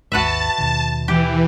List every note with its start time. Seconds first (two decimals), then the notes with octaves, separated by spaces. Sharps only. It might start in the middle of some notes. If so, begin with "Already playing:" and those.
0.12 G#1 D#2 F#4 B4 E5 A5
0.58 D#2 B2 D#3
1.08 E3 G4